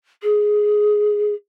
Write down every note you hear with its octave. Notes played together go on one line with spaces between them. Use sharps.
G#4